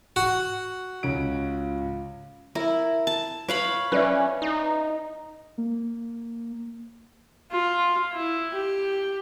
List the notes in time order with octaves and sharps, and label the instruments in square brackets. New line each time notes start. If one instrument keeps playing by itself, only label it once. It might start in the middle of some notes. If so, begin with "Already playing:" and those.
[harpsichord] F#4
[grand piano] C#2 C#4 D7 [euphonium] F4
[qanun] E4 [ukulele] A#4
[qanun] A5
[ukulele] B4 [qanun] C#5 F5 B5
[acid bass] C#4 [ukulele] B4 D5 E5
[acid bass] D#4
[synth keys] A#3
[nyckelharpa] F4
E4
G4